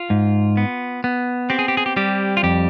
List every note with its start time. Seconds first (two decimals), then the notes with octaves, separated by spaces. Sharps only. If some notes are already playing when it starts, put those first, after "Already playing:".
Already playing: F4
0.10 G#2
0.57 B3
1.04 B3
1.50 C4 G4
1.59 G#4
1.68 G4
1.77 G#4
1.86 G4
1.97 G3 G4
2.37 F4
2.43 F2 G4